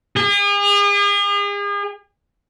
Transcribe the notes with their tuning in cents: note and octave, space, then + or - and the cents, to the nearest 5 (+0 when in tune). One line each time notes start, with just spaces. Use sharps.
G#4 -40